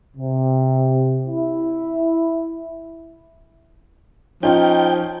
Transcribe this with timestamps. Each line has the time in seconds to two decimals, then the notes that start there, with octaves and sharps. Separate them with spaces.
0.16 C3
1.27 E4
4.43 F3 C#4 D#4 F4 G5